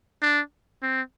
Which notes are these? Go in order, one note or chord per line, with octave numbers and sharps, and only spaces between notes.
D4
C4